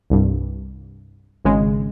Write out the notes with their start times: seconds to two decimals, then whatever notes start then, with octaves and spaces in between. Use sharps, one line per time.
0.10 C2 G2
1.45 G#1 C#3 G#3